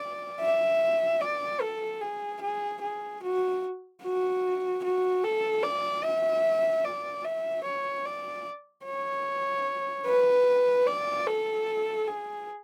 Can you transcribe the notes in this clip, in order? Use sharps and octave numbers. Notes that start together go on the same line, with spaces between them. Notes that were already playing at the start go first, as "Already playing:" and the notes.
Already playing: D5
E5
D5
A4
G#4
G#4
G#4
F#4
F#4
F#4
A4
D5
E5
D5
E5
C#5
D5
C#5
B4
D5
A4
G#4